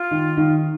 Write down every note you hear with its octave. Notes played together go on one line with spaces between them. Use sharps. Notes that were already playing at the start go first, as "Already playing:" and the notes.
Already playing: F4
D#3
D#3